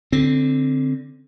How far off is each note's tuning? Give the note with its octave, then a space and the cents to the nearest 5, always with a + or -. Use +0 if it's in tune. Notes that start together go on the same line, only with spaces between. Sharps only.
D3 +0 C4 +0